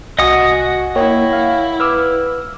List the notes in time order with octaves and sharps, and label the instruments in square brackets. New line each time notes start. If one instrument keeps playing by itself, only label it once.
[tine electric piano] C2 [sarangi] F#4 [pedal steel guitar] D#5 F#5 D#6 [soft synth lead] G#5
[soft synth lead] A#3 [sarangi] E4 [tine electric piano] C#5 G5
[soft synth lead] F5
[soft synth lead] B4 [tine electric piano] D6 E6 F6